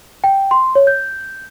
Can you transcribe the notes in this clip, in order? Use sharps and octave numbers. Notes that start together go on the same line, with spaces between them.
G5
C6
C#5
G6